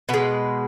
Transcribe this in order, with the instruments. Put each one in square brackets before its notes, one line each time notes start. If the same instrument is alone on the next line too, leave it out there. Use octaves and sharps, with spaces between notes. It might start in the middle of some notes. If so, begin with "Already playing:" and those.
[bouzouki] B2 G#3 B4